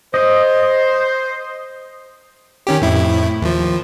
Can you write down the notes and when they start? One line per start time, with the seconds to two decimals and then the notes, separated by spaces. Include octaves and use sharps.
0.14 C5 D#5
2.67 D#3 C#4 G4
2.81 F2 A2 E4
3.42 D#2 F3